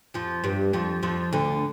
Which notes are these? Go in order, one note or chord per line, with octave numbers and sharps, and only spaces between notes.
F2 F3
G2 G3
F2 F3
F2 F3
D2 D3